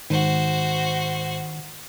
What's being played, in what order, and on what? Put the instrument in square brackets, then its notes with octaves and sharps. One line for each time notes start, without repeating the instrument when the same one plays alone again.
[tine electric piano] G#2 [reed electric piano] D#3 [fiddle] F#4 C5